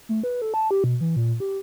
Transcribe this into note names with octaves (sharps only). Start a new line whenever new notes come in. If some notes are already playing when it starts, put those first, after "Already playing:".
A3
B4
A4
A5
G4
B2
E3
A#2
G4